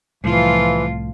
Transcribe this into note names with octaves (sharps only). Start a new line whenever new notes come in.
C2 A2 E3 F3 F4